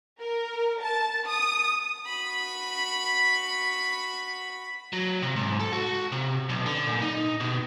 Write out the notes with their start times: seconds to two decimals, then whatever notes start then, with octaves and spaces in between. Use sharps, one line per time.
0.21 A#4
0.82 A5
1.29 D#6
2.06 F#4 B5
4.93 F#3
5.22 C3
5.36 G#2
5.60 A4
5.73 F#4
6.12 C3
6.49 B1
6.66 D3
6.87 A#2
7.02 D#4
7.40 B2